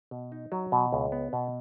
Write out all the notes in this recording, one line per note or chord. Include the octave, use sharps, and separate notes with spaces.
B2
D#4
F#3
B2
C#2
B3
B2